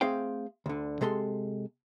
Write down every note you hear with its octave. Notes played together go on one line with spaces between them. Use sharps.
A3 C4 G#4 C5 F5 G5
D2 D3
C3 G#3 A4 B5 C6